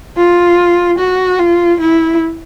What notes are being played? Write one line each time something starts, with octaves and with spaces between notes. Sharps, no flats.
F4
F#4
F4
E4